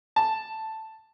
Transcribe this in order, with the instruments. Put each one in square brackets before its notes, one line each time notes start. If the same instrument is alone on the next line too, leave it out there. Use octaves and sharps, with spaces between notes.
[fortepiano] A5